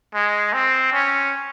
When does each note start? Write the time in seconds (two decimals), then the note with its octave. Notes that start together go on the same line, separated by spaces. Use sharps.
0.14 G#3
0.53 C4
0.93 C#4